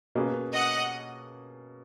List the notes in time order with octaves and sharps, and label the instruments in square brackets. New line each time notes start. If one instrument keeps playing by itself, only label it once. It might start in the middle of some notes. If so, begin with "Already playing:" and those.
[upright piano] B2 A#3 C#4 G#4 B4
[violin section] D#5 F#5